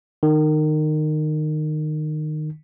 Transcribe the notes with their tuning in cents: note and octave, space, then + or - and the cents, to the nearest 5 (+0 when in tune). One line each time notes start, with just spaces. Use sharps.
D#3 -25